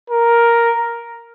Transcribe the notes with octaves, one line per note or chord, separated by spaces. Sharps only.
A#4